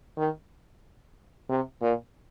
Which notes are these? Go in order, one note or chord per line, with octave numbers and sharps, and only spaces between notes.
D#3
C3
A#2